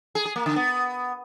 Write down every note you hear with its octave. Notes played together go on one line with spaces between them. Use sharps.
G#4
G#4
A#3
D3
B3